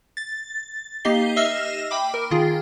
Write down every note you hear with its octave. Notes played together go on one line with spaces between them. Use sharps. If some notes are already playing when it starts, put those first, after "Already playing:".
A6
A#3 D#4 G4 D#5 C7 G7
D#5 E5 E6 F6 A#6 C7
G5 B5 D6
A#4
D#3 F4 G#4